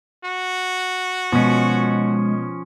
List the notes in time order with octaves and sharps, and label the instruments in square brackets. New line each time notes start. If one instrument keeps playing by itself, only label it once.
[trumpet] F#4
[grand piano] B2 [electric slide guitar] F3 C#4 [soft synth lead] G#3